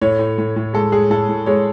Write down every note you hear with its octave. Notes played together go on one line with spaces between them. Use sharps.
A2 C#5
A2
A2
A2
G#3 A4
G#3 G#4
A2 A4
A2
G#3 C#5